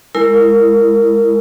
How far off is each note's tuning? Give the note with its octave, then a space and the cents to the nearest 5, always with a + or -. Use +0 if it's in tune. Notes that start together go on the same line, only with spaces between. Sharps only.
G#3 +0 E4 +15 A#4 -20